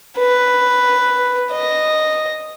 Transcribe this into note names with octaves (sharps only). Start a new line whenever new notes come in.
B4
D#5